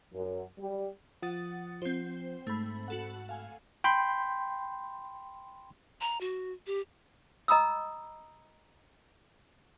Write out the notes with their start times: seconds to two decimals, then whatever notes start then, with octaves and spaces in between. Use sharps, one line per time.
0.14 F#2
0.59 G3
1.22 F3 F#5 D#6 A6
1.82 F3 C4 C5
2.47 G#2 A3 B5
2.88 F#4 A4 F#5
3.29 F5 G#5
3.84 G5 B5 C6 G6
6.01 A#5
6.21 F#4
6.67 G4
7.48 D#5 A#5 B5 D#6 E6